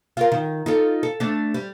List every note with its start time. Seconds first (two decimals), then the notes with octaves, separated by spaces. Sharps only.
0.17 F4 A#4
0.32 D#3
0.66 D#4 F4 A4
1.03 A4
1.20 A3 D4
1.54 G3